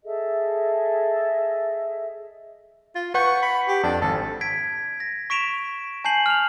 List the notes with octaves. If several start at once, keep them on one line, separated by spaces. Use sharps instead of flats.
G#4 A4 D#5 E5
F4
B4 F#5 C#6 G6
B5
G4
F2 D4
G#1 A4
G#6 B6 D7
A#6
C#6 B6 D7 E7 F7
G#5 A5 G6 C7 F#7
F6 F7